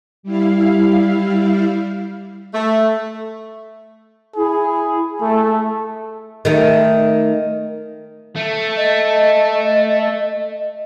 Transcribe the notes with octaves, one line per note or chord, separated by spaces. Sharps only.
G3 E4 F5
A3
E4 G#4
A3 A4
D#3 A3
A3
D#5